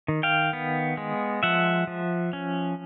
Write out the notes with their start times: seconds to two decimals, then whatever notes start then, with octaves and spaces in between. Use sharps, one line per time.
0.08 D#3
0.23 F5 G5
0.53 B3
0.97 G#3
1.43 F3 E5 F#5
1.87 F3
2.33 C#4